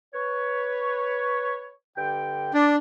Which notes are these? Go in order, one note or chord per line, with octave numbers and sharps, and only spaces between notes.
B4 C#5
G2 D3 G5
D4 D5